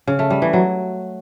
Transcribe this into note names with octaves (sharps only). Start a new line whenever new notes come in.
C#3
A3
G3
E3
F#3